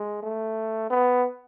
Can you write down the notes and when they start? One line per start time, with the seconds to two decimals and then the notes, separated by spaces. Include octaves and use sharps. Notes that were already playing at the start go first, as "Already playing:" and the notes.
Already playing: G#3
0.23 A3
0.90 B3